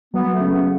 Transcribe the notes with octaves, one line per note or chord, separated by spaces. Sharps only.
F#3 B3
A3
C#3
B3